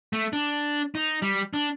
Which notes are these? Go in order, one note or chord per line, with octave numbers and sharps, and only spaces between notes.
A3
D4
D#4
G3
D4